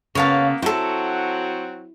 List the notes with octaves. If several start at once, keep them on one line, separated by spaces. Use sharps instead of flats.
C#3 A#3 B3 C#5 F5 A5
F#3 C4 E4 F#4 A4 C5